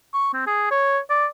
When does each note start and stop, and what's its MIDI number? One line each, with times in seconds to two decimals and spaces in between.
0.14 0.31 85
0.33 0.44 60
0.47 0.67 68
0.71 0.99 73
1.10 1.26 74